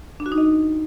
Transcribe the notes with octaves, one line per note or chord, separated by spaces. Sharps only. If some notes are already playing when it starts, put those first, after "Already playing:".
D4
F#4
D#4
D#5